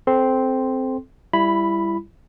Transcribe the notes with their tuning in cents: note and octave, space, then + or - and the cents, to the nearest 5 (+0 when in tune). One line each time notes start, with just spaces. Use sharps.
C4 -5 A4 -25 C6 +0
G3 +15 E4 +20 B5 +0